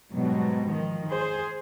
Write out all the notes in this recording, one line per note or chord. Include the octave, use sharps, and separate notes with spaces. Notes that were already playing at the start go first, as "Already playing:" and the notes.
G#2 B2 F#3 G3
D#3 F3
G#4 C5